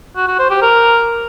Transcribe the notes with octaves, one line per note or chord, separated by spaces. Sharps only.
F#4
F#4
C5
G4
A#4